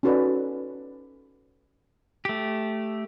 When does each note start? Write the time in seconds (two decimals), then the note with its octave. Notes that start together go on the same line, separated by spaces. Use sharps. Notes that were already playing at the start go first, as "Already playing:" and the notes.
0.03 C#4 D#4 F#4 A4 B4 D5
2.25 A3 G4